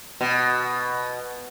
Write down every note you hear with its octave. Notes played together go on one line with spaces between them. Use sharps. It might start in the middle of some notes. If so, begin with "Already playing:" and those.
B2